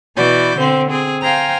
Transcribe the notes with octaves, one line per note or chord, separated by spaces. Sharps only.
B2 E3 F#4 D5 G6
D3 C4 C5
C4 G#4
C5 F5 G5 G#5 A#5 F6